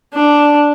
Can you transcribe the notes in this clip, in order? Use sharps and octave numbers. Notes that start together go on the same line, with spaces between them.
D4